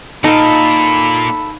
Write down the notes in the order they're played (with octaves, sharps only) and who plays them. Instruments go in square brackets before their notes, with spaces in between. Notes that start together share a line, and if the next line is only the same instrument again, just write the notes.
[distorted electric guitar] A#2 [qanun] D#4 [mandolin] A4 F5 [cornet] B5